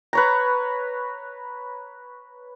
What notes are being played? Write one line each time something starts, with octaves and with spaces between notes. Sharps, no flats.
B4 C#5 A#5